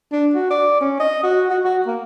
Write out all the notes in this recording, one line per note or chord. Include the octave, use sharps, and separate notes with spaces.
D4
F#4
D5
C#4
D#5
F#4
F#4
F#4
A#3